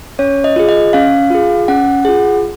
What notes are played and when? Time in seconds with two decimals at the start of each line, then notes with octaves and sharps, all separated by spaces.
0.19 C#4 C#5
0.44 D#5
0.56 F4 G#4
0.69 D#5
0.93 C#4 F5
1.31 F4 G#4
1.68 C#4 F#5
2.05 F4 G#4